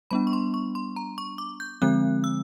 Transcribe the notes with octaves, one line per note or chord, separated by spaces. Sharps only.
G3 B3 D4 B5
C#6
C6
C#6
C6
A#5
C#6
D6
G6
D3 F3 G#3 C4 F#6
E6